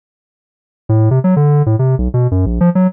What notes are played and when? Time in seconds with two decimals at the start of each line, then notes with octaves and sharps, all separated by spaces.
0.89 A2
1.11 C3
1.24 F#3
1.36 D3
1.66 A2
1.79 C3
1.98 B1
2.14 B2
2.31 F#2
2.46 A#1
2.61 F3
2.75 F#3